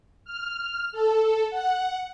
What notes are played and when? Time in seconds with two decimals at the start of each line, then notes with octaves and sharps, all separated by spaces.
0.25 F6
0.92 A4
1.50 F#5